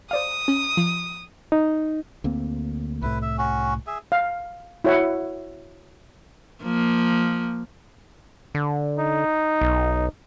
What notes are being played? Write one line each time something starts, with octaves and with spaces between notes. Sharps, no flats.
C5 D5 F5 D#6
C#4
F3
D#4
D2 A#3 C4
C2 A2 E4 B4
E5
C#4 F#4
G#4 E5
F5
E4 F#4 C#5 E5 F#5
F3 A#3
D3
D#4
B1